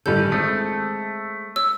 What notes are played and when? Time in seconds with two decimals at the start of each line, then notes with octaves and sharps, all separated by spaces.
0.06 A1 D3 D#3 G3 A4 G6
0.32 G#3 A3 C4 D#6
1.56 C#5 E6